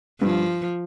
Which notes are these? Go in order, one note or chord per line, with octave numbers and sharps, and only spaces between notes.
G2 F3